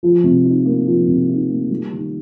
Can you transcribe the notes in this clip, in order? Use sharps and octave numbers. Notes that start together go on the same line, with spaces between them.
F3
C3
D#4
A#3
F3
C3
D#4
A#3
G3
D#3